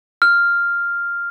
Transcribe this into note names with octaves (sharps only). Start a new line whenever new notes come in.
F6